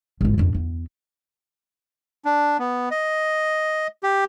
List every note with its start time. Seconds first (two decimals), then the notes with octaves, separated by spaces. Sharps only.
0.21 G#1 F4
0.38 F2 D4
0.54 E2
2.25 D4
2.59 B3
2.91 D#5
4.03 G4